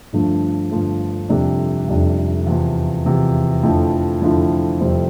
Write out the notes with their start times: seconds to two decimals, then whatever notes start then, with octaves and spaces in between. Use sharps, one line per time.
0.13 G1 G2 D3 F3 A3
0.71 G1 G2 D3 F3 A3
1.29 F1 F2 C3 G3 D4
1.88 F1 F2 C3 G3 D4
2.47 E2 C3 F3
3.05 E2 C3 F3
3.63 F2 D3 F3 A3 E4
4.21 F2 D3 F3 A3 E4
4.81 F1 F2 C3 G3 C4